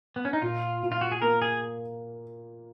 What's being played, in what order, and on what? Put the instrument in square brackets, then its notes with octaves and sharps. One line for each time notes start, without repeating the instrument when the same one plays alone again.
[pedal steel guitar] B3
C#4
D#4
[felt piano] A#2 [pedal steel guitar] F4
[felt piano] A#2
[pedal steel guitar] F4
F#4
G#4
[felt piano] A#3 [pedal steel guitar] A#4
[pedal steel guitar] G#4